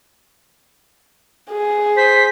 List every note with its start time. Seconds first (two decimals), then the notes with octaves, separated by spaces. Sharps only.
1.52 G#4
1.97 C5 B6